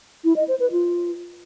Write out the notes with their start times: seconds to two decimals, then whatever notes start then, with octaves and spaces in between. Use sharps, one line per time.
0.24 E4
0.36 D#5
0.48 C5
0.60 B4
0.72 F4